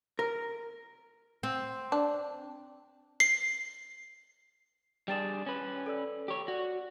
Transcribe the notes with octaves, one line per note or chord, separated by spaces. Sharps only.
A#4
C4
D4
C7
G3 D4 G#4 G5 A6 E7
C#4 B4
A4 D5 E6
G4 C#5
F#4 D5